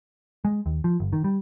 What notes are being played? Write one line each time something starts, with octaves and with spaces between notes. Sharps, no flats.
G#3
D#2
F3
G1
D#3
G3